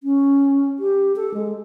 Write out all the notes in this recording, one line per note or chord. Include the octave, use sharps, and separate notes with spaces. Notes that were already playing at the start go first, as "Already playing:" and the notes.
C#4
G4
A4
G#3